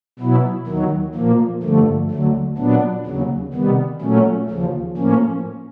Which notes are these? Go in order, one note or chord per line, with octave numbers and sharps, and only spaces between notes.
B2 F#3 B3 E4
D#2 D#3 F#3
A#2 F3 A#3
G2 D3 F3 A3
D2 D3 F#3 A3
A#2 F#3 B3 D4
D#2 C#3 F#3
C3 D#3 G3 B3
A#2 F#3 A3 C#4
D#2 C#3 F3
A2 F3 A#3 C#4